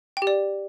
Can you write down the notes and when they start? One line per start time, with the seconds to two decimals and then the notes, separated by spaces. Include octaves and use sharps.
0.17 G5
0.22 G4
0.27 D5